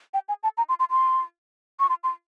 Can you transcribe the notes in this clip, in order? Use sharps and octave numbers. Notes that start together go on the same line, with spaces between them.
G5
G#5
A5
A#5
C6
C6
C6
C#6
C6
C6